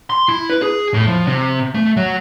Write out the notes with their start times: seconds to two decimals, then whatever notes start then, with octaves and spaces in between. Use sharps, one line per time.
0.10 C6
0.29 E4
0.50 B4
0.62 G#4
0.94 A2
1.07 F3
1.27 C3
1.75 A3
1.97 F#3